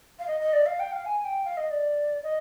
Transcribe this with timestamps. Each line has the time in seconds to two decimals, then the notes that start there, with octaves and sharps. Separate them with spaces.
0.19 F5
0.27 D#5
0.40 D#5
0.53 D5
0.66 F5
0.80 G5
0.92 F5
1.05 G#5
1.24 G5
1.45 F5
1.57 D#5
1.71 D5
2.23 D#5